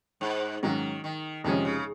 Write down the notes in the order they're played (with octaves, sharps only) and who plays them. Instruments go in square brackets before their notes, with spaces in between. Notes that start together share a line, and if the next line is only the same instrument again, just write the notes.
[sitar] G#2
[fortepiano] G#2 F#3 C#4 F#4 [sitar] D#3
[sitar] D#3
[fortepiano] F2 C3 F3 G#3 C#4 [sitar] D#3
[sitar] C#3